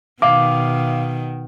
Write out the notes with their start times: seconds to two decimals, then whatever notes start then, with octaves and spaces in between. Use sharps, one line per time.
0.22 B2 D#3 F5 D6